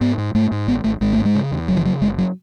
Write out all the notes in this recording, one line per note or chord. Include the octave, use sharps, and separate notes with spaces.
G#2 B3
G#2
G#2 A3
G#2
G#1 B3
G#1 A3
G#1 G#3
A3
G#2
G#3
C#3
E2
F#1 F#3
E3
C#3 F#3
F#1 G#3
F#3